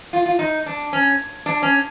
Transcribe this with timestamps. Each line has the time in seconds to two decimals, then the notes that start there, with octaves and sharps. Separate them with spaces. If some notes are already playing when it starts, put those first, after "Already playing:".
0.13 F4
0.26 F4
0.39 D#4
0.66 D4
0.93 C#4
1.46 D4
1.62 C#4